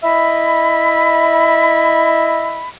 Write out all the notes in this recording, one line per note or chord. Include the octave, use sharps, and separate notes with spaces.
E4 D#5 E5 B5